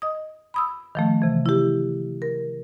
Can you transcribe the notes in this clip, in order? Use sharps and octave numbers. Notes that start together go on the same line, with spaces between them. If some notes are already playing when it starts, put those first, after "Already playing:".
D#5 D#6
B5 D#6 E6
D#3 F3 A3
C3 E3
E4 G4
A#4